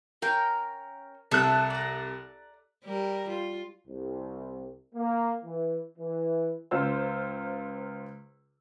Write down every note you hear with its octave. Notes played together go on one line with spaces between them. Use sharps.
C#4 A#4 G5
C2 D4 A4 E5 F#6
D5 A#5
G3 A#4
F4
C2
A#3
E3
E3
C#2 F4 C5 E6